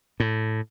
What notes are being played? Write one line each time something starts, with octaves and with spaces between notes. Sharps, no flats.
A2